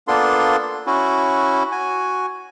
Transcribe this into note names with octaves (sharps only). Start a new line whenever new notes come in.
A#3 B3 D4 F4 A4 C6
C#4 E4 F#4
F#4 G#5